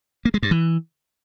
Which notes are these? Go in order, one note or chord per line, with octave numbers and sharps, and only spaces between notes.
A#3
G#3
G2
E3